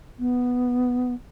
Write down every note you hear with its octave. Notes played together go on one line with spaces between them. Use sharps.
B3